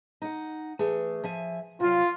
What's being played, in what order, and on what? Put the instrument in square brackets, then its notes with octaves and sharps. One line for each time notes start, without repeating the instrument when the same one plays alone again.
[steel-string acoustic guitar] D#4 F#5
E3 A3 G#4
F3 E5 G#5
[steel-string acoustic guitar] C3 F#3 [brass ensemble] F4